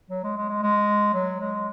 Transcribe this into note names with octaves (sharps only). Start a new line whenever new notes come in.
F#3
G#3
G#3
G#3
G#3
F#3
G#3